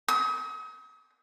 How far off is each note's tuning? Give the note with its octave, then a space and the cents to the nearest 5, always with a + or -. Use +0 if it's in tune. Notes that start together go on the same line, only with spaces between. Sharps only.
D#6 +40